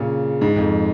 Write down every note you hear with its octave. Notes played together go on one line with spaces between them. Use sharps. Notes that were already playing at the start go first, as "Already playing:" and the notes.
Already playing: A#2 C#3
G#2
F2